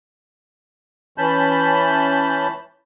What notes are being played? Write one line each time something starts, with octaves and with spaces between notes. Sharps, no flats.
E3 C#4 A5 B5 G6